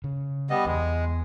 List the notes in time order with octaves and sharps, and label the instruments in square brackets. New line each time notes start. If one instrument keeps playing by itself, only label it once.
[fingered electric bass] C#3
[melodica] G3 B3 D#5
[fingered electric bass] E2 [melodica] G#3